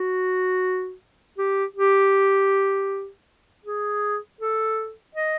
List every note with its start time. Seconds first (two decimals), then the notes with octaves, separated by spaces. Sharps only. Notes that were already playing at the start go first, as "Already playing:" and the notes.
Already playing: F#4
1.38 G4
1.76 G4
3.65 G#4
4.41 A4
5.15 D#5